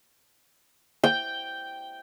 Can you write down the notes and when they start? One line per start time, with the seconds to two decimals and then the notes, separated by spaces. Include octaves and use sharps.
1.04 G5